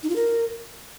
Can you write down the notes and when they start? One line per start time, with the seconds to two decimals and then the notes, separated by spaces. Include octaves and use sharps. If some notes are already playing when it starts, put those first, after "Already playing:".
0.03 D#4
0.10 F4
0.16 A#4